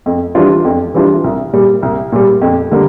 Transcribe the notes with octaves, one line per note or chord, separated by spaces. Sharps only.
F2
E3 G3 D4 F4
F2
E3 G3 D4 F4
C2
A#2 G3
C2
A#2 G3
F2
D3 G3 A#3